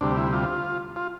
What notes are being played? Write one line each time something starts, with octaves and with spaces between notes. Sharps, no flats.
D2 C3 G3 D4
E4
F4
F4